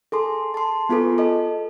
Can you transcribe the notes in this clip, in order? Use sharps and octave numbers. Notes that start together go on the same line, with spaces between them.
G#4 A4 C6
A5 C6
B3 F4 G#4 A4 B4
A4 D#5